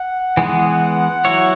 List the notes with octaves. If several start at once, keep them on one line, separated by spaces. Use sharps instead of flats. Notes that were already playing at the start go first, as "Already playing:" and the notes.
Already playing: F#5
E3 G#3 B3
F#3 E4 C#5